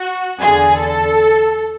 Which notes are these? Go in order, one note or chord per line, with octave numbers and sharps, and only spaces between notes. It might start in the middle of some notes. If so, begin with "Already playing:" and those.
Already playing: F#4
E2 D3 G#4
A4